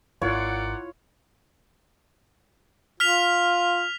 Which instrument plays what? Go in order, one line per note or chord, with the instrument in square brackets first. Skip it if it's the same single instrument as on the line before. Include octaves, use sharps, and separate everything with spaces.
[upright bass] G#1 [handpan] E4 F4 F5 [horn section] A#4 D5 F#5 [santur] C#5
[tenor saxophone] F4 [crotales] F6 B6 F7